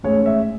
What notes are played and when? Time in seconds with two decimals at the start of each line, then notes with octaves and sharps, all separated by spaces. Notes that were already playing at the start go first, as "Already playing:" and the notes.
0.03 A1 G#2 G#3 C#4 C#5
0.26 E5